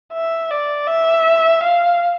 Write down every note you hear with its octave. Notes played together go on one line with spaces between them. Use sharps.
E5
D5
E5
F5